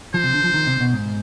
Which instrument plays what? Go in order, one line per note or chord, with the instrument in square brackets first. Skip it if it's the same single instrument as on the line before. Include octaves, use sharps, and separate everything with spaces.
[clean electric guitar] F3 [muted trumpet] C5
[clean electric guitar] C3
D3
F3
D#3
C3
B2
G#2